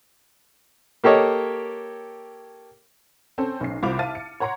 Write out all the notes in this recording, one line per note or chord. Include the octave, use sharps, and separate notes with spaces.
A#3 G4 A4 C#5 D#5
C4 C#4 A4 C5
B1 C#4 C7
C2 F4 C5 B5 D6 F7
E5 F5 A5 F6 A6 D#7
C#7
C#5 F#5 A#5 C6 C#7